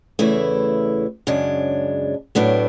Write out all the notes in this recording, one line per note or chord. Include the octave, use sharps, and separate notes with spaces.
E2 C#3 E3 A3 E4
F#2 C#3 G#3 D4
A2 F#3 B3 D4 F#4